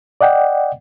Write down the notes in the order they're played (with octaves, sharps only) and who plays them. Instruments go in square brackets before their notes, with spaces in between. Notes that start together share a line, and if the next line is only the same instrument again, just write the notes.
[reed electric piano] D5 D#5 F#5 G5